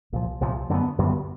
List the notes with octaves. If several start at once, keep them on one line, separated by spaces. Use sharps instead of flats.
C2 A#2 F3
C2 A#2 F3
F#2 D3 G3 B3
F#2 D3 G3 B3